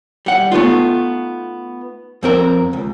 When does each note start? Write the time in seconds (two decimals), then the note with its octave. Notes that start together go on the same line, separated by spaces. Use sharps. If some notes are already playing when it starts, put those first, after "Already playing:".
0.26 G3 F#5
0.52 A3 B3 D#4 F4
2.23 F2 C4 A#4
2.73 C#2